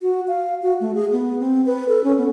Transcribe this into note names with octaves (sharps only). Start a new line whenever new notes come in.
F#4
F5
F#4
A3
G#4
B3
C4
B4
A4
C#4
B3